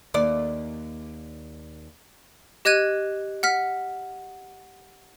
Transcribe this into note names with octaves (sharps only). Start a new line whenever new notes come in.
D#2 D5
G4 D#5 F#6 G#6 D#7
F#5 F6 B6